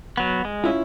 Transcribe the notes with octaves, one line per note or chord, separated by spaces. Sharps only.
F#3 B3
G#3
C#4 E4 F4